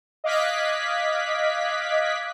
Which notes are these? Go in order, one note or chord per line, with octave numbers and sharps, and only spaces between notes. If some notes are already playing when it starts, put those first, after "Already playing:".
D#5 F5 D6 F#6 G#6 B6